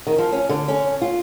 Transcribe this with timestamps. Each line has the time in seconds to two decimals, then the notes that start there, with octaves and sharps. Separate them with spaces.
0.07 D#3
0.18 F3
0.32 C#4
0.49 D3
0.68 C#4
1.02 F4